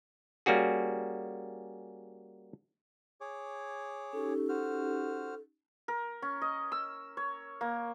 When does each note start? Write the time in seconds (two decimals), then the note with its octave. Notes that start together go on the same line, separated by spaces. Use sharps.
0.46 G3 A#3 C#4 F#4 G#4
3.21 G#4 C#5 D6
4.13 C#4 D#4 G4 A4
4.49 F#4 C5 F6
5.88 A#4
6.22 C#4
6.41 D#5
6.72 E6
7.17 C#5
7.61 A#3